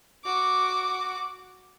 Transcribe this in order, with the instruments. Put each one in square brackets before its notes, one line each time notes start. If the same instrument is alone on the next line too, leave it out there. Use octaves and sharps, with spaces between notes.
[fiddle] F#4 D6